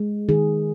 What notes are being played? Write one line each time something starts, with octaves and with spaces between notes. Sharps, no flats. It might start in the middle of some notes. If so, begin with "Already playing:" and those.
Already playing: G#3
D#3 G#4